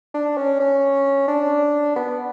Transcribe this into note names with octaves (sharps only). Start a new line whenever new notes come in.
D4
C#4
C#4
D4
B3